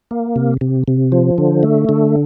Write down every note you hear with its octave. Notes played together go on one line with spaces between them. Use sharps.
A#3
C3
C3
C3
F3
D3
A3
D3